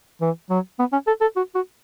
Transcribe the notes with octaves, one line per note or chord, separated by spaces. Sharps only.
E3
F#3
B3
C#4
A4
A4
F#4
F#4